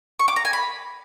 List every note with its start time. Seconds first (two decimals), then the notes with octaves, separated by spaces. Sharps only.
0.19 C#6
0.28 D6
0.36 A#5
0.45 G#5
0.53 B5